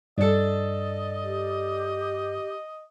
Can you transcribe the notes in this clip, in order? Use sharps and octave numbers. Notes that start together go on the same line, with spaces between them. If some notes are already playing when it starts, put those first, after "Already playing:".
G2 D4 A4 D#5
G4